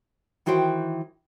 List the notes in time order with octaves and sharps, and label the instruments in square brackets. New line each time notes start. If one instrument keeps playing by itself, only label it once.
[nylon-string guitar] D#3 E3 F#4 C5 G5